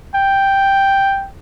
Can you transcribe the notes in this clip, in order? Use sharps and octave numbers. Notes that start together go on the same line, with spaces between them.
G5